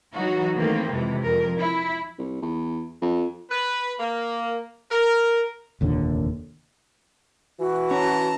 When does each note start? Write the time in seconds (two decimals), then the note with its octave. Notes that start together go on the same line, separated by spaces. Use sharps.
0.14 E3 F#3 D#4 F#4
0.56 D#3 E3 A3 A#3 C4
0.89 F2 C3 E3 G#3
1.23 F2 A#4
1.57 E4
2.19 C2
2.42 E2
3.02 F2
3.50 B4
3.99 A#3
4.91 A#4
5.81 F1 D#2 A#2 D3
7.60 E3 F#4
7.91 C#4 A5 A#5